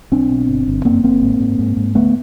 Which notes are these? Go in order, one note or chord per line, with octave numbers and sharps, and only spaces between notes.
B1 C4 D4
B2
G1
G1
F#2 A#3 C4
G1 A#3 C4
G#2
G#2
G#2
G#2
D2 A3 B3